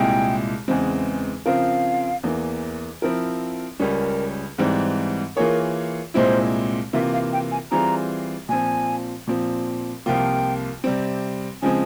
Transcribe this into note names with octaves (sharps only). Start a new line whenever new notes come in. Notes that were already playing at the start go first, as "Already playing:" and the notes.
Already playing: C2 A#2 G#3 E4 G#4 G5
E2 C#3 E3 G#3 C4
C#3 F3 C4 F4 A#4 F5
E2 E3 A#3
F3 C4 E4 A#4
C#2 C#3 G3 C#4 A#4
G#2 E3 G3 C4
E3 A#3 F4 G#4 A#4 C#5
C2 A#2 G#3 C4 E4 C5
C3 E3 A#3 F4 E5
F5
G5
G#5
E3 G3 C4 F4 G#4 A#5
A#2 F3 C4 G#5
A#2 F3 C4
C2 C3 F3 A#3 F4 G5
C3 G3 C4
C#3 F3 G#3 C4 G#5